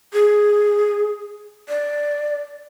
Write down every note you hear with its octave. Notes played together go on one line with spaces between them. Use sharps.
G#4
D5